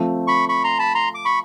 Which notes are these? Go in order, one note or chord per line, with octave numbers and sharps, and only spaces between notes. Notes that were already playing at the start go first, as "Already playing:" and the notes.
Already playing: F3 A3 C4 F4
B5 C#6
B5 C#6
A#5 C6
A5 B5
A#5 C6
D6
B5 C#6